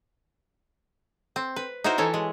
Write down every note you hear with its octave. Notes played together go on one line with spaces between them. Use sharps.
C4
B4
D#4 E4 F#4 A#4 C5
E3 E4 A4 C#5
G#3